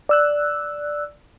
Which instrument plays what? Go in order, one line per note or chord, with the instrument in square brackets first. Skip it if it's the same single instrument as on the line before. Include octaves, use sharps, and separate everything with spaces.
[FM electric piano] D5 E6 F#6